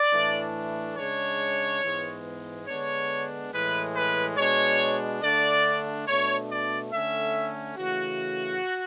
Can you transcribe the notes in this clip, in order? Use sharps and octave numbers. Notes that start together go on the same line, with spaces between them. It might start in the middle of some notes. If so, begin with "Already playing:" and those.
Already playing: D5
A2 E3 A3 D4
C#3 G#3 D4 C#5
G#2 E3 G#3 B3
D3 G#3 B3 D4 C#5
A2 E3 G#3 B4
B4
B2 G#3 D4 C#5
D3 A3 D4 D5
B2 A3 D4 C#5
D5
D3 A3 C#4 E5
C#3 E3 A3 F#4